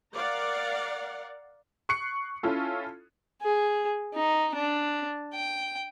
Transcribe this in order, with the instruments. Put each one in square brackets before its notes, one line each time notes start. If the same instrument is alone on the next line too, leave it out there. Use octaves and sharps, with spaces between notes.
[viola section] A#4 D5 F5 F#5
[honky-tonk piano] C#6 F#6 C7 C#7
C#4 E4 F4 A4
[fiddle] G#4
D#4
D4
G5